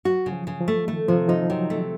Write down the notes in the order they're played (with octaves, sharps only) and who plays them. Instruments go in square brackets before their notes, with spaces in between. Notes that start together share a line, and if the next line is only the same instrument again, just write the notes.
[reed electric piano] F#3 [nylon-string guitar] F#4
[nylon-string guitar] C#3
[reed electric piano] F3
[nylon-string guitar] C#3
[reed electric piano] F3
[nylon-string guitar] A3
[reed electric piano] D#3 [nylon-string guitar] A3
[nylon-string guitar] C3 [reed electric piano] F3
[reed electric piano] F3 [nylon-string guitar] D#4
[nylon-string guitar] C3 [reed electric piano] F#3
[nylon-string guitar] A3